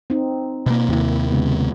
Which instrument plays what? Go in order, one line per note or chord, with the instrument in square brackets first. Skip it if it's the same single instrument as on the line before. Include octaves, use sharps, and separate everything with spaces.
[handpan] C4 D#4
[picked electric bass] B2 A#3
[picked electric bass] D#2 C3 [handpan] A#3 E4
[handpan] C#3 G#3 B3